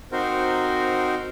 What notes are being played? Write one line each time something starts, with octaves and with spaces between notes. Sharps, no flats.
C4 D#4 F#4 A#4 C5